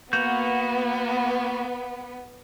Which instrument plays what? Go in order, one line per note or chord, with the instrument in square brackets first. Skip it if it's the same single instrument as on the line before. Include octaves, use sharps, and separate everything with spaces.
[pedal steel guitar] A#3 F#4 G6 [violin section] B3